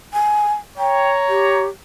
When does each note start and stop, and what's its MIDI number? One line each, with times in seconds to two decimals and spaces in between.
0.13 0.53 80
0.78 1.67 73
0.78 1.09 79
0.78 1.67 82
1.29 1.67 67